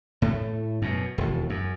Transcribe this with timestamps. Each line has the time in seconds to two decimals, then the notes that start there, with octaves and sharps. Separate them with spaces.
0.22 A2 A3
0.82 F#2 B2
1.18 E1 D#2
1.50 F#2